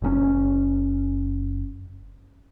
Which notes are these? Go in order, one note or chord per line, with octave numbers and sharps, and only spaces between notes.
F#1 A#2 C#4